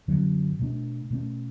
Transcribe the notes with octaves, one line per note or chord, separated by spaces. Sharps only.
F#2 D3 F#3 C#4
B2 A3 D4
B2 A3 C#4